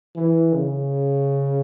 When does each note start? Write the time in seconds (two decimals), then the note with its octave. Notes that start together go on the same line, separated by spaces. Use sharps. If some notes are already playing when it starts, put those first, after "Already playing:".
0.16 E3
0.53 C#3